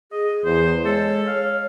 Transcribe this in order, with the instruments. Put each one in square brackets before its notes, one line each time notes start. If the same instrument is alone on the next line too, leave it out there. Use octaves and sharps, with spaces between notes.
[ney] G#4 [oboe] D#5
[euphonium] E2 [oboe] C5
[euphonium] G#3 [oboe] A4 [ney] C#5
[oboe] F5